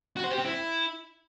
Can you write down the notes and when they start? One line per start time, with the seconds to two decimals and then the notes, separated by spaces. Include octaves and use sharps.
0.17 F#4
0.24 C5
0.31 G4
0.38 C4
0.45 E4